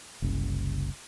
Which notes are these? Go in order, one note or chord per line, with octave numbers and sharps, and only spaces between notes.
F#1 C2 C#3